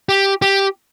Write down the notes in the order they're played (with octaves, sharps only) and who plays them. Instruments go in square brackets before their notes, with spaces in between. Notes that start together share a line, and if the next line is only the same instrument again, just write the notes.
[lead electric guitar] G4
G4